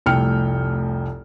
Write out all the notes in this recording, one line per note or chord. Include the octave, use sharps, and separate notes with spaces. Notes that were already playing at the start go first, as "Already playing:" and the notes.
F1 C2 A3 G5 F6 C#7